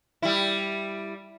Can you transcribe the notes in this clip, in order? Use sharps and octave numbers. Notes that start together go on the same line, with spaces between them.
G3 E4